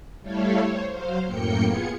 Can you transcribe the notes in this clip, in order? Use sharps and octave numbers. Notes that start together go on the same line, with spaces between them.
G3 A3 E4 A4 C#5 F5
C5 C#5
F#3 C5 F5
F#2 A2 A#3 G5 G6 C#7
B3 F4 G#4 G#6 C#7